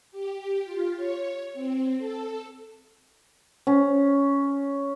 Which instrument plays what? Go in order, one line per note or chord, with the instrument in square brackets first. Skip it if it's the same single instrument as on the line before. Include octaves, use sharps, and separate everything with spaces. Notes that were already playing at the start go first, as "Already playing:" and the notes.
[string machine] G4
F4
C#5
C4
A4
[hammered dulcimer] C#4